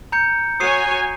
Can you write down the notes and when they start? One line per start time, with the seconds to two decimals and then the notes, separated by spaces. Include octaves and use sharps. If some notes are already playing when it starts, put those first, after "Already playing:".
0.12 A#5 G6 C#7
0.60 F#4 C#5 G#5 D#6 C7 D#7